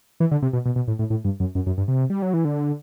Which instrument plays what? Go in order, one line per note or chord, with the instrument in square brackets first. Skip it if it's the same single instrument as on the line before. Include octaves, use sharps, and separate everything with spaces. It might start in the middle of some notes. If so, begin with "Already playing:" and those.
[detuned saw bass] E3
D3
C3
B2
B2
B2
A2
A2
A2
G2
F#2
F#2
F#2
G2
C3
G3
F#3
E3
D3